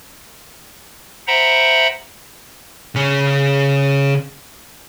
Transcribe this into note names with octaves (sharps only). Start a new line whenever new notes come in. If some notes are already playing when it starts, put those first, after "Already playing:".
C5 E5 F#5 G5 A#5 B5
C#3 C#4